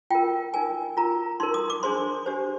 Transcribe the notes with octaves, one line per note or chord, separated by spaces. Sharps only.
F4 A#4 G5
D#4 A#4 G#5
F4 A#4 A#5
D#4 A#4 C6
D#6
D6
D4 G#4 C5 C6
D4 G4 C5